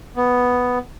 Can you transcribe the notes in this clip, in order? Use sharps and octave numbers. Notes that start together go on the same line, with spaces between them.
B3